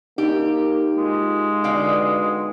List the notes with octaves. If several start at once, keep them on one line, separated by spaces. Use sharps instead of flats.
A#3 D#4 G4
G#3 F4
B2 D3 F5 G5